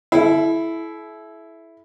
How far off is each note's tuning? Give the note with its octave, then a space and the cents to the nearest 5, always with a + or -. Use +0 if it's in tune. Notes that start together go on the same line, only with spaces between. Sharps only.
E4 +0 A4 -45